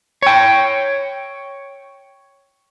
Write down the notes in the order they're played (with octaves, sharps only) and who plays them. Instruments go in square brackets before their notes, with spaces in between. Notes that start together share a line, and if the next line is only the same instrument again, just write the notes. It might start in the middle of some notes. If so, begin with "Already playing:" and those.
[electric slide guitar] C#5 G5